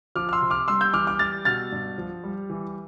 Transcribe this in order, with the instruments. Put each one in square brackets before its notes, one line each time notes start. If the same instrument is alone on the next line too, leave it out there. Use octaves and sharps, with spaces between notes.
[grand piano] F3 D6 F6
F6
C6 E6
C3
D6 F6
G3 C6 E6
E6 G6
E3 D6 F6
D6 F6
G3 F6 A6
B2 F6 A6
G2
F3
G3
E3